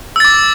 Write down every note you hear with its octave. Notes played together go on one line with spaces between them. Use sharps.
D6 E6 A6